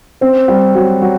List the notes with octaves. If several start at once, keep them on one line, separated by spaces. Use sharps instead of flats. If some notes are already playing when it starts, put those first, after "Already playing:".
C4 C5
G3 G4
F#3 F#4
F#3 F#4